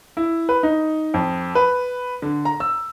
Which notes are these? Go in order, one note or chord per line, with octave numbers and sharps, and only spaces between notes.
E4
B4
D#4
F2
B4
D3
A#5
E6